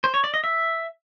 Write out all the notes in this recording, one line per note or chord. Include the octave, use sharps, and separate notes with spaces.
C5
C#5
D5
D#5
E5